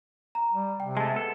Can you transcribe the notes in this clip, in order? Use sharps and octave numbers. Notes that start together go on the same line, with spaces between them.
A#5
G3
C3 G5
G#3 A3 A5
B3 A4